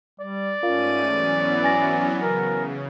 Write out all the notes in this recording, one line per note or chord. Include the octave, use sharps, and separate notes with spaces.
G3 D5
G#2 A3 C#4 F4 A#4 F5 D#7
E3 F#3 B3 G#5
G#5 A6 A#6
C#3 A#4